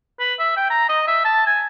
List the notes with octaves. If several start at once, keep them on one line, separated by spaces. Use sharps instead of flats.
B4
E5
G5
A#5
D#5
E5
A5
G#5